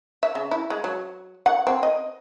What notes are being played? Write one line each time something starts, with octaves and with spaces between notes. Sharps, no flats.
E5
C#3
E4
G#3
F#3
F#5
C4
D#5